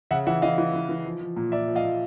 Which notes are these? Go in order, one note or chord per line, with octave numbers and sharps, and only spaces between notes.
C#3 E5 F#5
E3 E5 F#5
E3 D#5 F5
E3
E3
E3
F3
F3
A#2
A#2 D5 E5
F3
D#5 F5
A#2